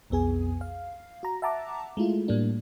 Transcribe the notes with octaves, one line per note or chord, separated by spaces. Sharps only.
B1 F2 B3 G#4 G#5
F5
F#4 A#5
E5 F#5 A5 A#5 D6
G#3 A3 E4 F4
A2 G3 A#3 D4